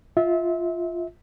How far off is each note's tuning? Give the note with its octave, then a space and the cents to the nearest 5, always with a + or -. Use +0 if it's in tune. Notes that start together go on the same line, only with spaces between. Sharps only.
F4 -5 E5 -30